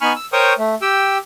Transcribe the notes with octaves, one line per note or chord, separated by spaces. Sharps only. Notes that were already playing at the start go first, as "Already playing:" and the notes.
B3 D#4 G#5 B5 C#6 F6
E6
A#4 C5 C#5 G5 C#6 D#6
A3
G4 G5 E6